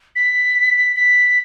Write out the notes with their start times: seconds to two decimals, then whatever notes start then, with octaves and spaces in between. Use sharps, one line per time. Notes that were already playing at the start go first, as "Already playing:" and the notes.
0.16 B6
0.96 B6